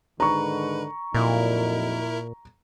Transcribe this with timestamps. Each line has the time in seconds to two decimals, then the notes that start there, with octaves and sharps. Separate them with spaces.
0.20 G#2 D3 D#3 B4 A#5 C#6
1.15 F2 A#2 F#3 D#4 E4 A#4